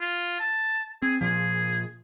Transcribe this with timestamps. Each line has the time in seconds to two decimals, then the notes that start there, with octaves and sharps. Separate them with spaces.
0.01 F4
0.40 A5
1.02 C4 G#4
1.21 A#2 F3 G#4